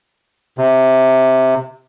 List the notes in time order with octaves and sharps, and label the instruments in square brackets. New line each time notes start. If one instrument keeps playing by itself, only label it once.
[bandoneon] C3